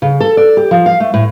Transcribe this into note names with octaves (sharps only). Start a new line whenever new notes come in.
C#3
A4
D5
G4
F3
F5
A3
A2